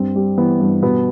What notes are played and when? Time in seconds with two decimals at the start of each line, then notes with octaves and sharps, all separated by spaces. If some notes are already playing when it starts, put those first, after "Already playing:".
Already playing: G2 C4
0.16 G3
0.38 E3 B3
0.60 G2
0.82 B2 B3